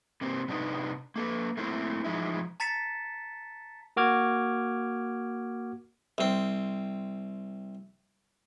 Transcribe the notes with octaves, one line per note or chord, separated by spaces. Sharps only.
C3 A#3 C4
C3 D4 D#4 B4
A#3 A4 B4
A3 A#3 C4 E4 C5
E3 F3 G#3 D#4 E4
A5 A#5 A6 B6 C#7 E7
A#3 F#4 D6 F6 G#6
C2 C4